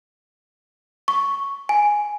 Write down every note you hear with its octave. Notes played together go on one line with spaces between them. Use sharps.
C#6
G#5